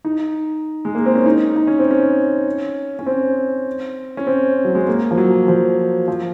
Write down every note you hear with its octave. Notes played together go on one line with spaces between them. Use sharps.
D#4
G#3
A#3
C4
C#4
D#4
D#4
C#4
C4
C#4
C#4
C4
C#4
C4
F#3
G#3
A#3
F3
F#3
F3
F3